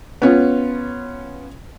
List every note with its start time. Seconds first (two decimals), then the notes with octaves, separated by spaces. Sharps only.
0.22 B3 C#4 F4